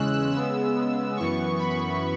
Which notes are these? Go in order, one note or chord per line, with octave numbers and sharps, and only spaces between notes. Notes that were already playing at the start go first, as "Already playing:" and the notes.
Already playing: E2 C#3 G#3 C#4 E6 F#6
C#3 G#3 B3 E6
F#2 E3 B3 C#6
B5